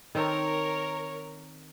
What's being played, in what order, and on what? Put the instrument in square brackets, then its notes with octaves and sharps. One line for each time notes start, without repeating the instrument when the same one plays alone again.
[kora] D#3 C4 A4 [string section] A#4 [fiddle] C#5